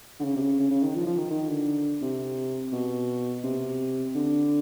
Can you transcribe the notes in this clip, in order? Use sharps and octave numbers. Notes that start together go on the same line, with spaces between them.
D3
C#3
C3
C#3
C#3
C#3
D#3
F3
F3
D#3
D#3
D3
C3
B2
C3
D3